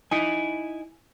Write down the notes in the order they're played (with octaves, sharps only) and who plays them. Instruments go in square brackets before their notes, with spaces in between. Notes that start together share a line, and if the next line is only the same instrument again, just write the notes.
[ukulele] D#4 [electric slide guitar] E4 G#5